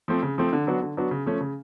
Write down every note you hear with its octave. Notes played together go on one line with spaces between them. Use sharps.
F3 A3 C4
C#3
F3 A3 C4
D3
F#3 B3 D4 F#4
D3
F#3 B3 D4 F#4
C#3
F3 A3 C#4
C#3